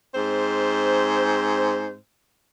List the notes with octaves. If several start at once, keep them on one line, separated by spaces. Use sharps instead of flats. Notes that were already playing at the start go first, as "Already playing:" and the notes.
G#2 C4 C5